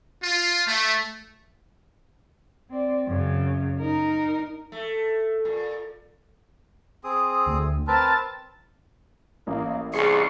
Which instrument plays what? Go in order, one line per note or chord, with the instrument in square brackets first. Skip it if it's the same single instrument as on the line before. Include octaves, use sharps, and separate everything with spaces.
[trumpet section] F4
A3
[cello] C4 D5
F#2 C#3
D#4 A#4
[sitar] A3
A#2
[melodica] C4 G#4 D#6
[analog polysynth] D2
[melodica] C4 A#4 B4 [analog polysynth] A5 A6
[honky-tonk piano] A1 [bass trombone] A#3
[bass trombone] C2 [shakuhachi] G#4 [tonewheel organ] C6 C#6